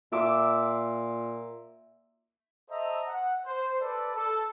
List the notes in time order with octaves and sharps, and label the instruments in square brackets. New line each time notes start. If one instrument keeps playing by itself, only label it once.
[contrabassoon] A#2 [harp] E5 D6
[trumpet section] A4 C5 D#5 E5 A#5
F#5
C5
A4 B4 D5
A4